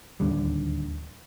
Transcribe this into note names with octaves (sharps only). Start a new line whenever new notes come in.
D1 D#2 D3 G3